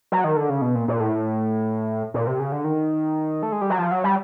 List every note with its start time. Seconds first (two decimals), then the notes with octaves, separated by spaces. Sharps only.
0.12 F#3
0.24 D#3
0.37 D3
0.49 C#3
0.62 B2
0.75 A#2
0.88 A#2
1.00 A2
2.14 A#2
2.27 C3
2.40 C#3
2.52 D3
2.64 D#3
3.43 A3
3.52 G#3
3.61 G3
3.70 F#3
3.78 F3
3.92 F#3
4.04 G3